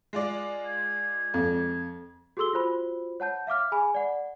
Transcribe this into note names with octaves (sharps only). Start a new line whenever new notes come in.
G#3 F4 D5
G#6
F2
F#4 G#4 A4 C6 E6 G7
F4 F#4 C5 B5
C#5 F#5 A5 G6
E5 F5 D6 F6
G#4 G#5 B5
D5 F#5